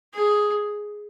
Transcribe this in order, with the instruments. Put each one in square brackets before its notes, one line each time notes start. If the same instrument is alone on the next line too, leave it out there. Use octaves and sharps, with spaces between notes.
[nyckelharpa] G#4